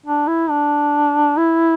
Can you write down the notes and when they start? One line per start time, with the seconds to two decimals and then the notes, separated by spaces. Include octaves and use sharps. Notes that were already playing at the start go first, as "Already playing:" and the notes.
0.06 D4
0.27 E4
0.50 D4
1.37 E4